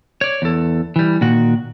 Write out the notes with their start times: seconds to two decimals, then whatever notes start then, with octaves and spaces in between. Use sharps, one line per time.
0.21 C#5 D5
0.42 E2 A4
0.96 E3 G3
1.21 A#2 D#3 F#4